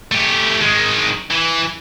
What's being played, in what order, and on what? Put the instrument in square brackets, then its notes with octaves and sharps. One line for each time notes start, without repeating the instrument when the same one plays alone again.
[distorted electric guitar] A3 G4
D#3 G#3
E3